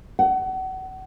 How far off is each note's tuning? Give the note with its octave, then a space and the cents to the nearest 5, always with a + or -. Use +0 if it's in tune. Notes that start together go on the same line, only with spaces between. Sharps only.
F#5 +30